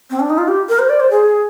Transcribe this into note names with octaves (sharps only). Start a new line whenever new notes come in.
C4
D4
D#4
F4
G4
A#4
C5
D5
C5
G#4